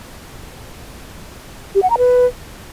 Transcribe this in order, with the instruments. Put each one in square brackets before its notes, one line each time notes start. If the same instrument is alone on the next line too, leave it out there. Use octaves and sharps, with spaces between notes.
[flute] G4
F#5
A#5
B4